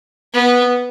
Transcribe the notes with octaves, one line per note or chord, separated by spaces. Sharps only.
B3